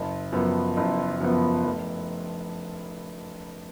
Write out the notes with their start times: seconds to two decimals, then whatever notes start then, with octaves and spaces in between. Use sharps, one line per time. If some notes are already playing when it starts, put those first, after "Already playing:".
Already playing: F#1
0.32 F#2 F3 B3
0.77 F#1
1.20 F#2 F3 B3
1.65 F1